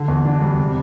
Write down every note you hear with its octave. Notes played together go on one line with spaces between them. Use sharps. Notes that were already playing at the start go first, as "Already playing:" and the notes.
Already playing: D3
E2
D4
G3
C3